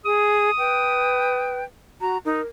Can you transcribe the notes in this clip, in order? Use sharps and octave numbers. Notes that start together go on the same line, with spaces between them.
G#4 D#6
B4 G5
F#4 A#5
D#4 A#4